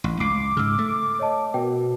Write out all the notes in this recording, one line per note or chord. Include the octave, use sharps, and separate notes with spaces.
A1
C#2 D6 C7
G#2 C#3 E6 F6
A3
C#5 D#5 A5
B2 A#4 G5